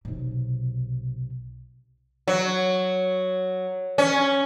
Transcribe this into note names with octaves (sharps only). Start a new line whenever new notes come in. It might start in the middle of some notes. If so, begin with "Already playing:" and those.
B1 C3
F#3
C#4